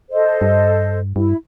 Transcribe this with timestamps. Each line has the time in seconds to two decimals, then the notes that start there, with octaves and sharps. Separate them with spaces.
0.11 A4 C5 D#5
0.41 G2
1.16 G2 E4